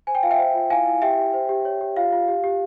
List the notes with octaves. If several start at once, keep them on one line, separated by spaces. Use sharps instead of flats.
C5 G#5
G5
F4 F5
E5 G5
C5
F4
E4 F5 G#5
E4
G4 E5 G5
G4
C5
G4
C#5
G4
F4 F5
F4
G4
G4